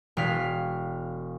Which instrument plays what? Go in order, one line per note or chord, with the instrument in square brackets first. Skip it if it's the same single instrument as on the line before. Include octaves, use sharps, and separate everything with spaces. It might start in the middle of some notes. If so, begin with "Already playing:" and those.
[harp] E1 F5 B6